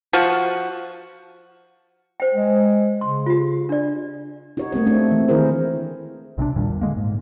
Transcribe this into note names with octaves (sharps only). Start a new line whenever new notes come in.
F3 F#4
C5 G5
G#3
C#3 C6
F4 G4
D4 D5
D#4 F#4 G4 C#5
A3 A#3 C4 C#5
A3 C4 D4
E3
D#3 E4 G#4 A#4 C5
B1 C3 C4 D4
E2 A#2 D#3 G3
D3 G#3 A#3
G#2